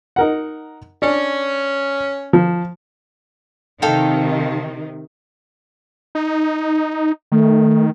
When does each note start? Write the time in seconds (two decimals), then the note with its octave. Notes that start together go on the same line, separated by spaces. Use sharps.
0.16 D#4 A#4 F#5
1.02 C#4 D4
2.33 F3
3.82 C3 D#3 A4 F5 G5
6.15 D#4
7.32 D#3 A3